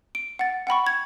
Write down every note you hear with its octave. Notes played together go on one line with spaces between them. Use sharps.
D7
F#5 A6
F#5 G5 B5 C#6
G#6